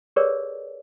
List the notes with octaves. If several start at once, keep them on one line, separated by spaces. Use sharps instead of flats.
G4 G#4 A#4 B4 C#5 D5